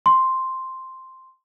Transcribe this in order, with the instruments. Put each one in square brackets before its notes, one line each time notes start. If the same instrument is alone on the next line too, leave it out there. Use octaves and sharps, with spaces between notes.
[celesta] C6